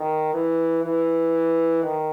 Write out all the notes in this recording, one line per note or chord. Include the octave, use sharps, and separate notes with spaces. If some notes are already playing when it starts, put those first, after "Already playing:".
Already playing: D#3
E3
E3
D#3